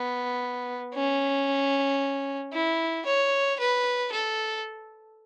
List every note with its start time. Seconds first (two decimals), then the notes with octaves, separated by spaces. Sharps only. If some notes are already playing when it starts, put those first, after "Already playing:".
Already playing: B3
0.94 C#4
2.54 E4
3.07 C#5
3.60 B4
4.12 A4